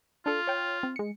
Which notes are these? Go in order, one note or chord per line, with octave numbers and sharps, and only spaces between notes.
D4 F4 A4
C#5 G5
C4
G#3 C#7